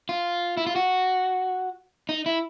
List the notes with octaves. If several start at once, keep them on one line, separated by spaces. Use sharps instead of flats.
F4
E4
F4
F#4
D#4
E4